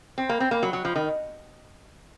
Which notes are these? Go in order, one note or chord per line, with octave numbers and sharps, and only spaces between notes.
C4
A#3
C4
A#3
F#3
F#3
F3
D#3